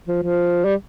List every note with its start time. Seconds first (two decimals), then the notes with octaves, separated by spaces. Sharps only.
0.08 F3
0.23 F3
0.65 G3